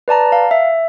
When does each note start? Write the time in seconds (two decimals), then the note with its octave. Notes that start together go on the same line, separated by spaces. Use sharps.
0.08 B4 D5 A5 A#5
0.32 F5
0.51 E5